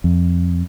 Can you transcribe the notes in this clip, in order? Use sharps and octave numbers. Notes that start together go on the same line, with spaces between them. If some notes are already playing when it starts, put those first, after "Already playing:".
F2